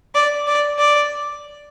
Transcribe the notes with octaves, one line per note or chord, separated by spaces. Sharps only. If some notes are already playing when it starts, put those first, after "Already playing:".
D5
D5
D5